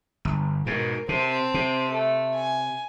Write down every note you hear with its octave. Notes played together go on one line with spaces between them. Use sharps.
G1
G#2 B2 A#4
C3 C4 A5
C3
A3
G#5